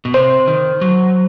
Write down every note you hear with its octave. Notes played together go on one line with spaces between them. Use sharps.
B2
C3 C5
D#3
F#3